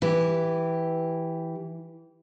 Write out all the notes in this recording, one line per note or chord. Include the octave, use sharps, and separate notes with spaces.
E3 G4